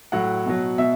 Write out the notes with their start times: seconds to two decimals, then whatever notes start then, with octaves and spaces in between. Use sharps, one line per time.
0.12 A2 F#3 F#5
0.46 B2 F#3
0.78 B2 E5